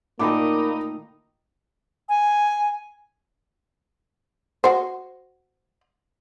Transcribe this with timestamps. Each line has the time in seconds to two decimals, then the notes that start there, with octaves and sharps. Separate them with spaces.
0.19 A#2 D#3 A3 A#3 D#4 A#4 B5 D6
2.09 G#5
4.64 F#4 C5